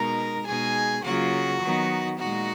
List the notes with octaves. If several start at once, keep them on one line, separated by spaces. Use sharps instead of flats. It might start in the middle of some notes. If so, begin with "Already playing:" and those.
Already playing: B2 G#3 D#4 A#4 A#5
B2 G#3 D#4 G#4 G#5
C#3 F#3 A#3 F4 F#4 F#5
D#3 F#3 B3 D#4
A#2 G#3 D#4 F#4 F#5